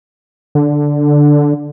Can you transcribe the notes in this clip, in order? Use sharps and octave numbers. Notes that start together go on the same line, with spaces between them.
D3